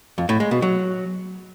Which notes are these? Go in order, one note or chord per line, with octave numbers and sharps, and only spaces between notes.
F2
A2
G#3
B2
F#3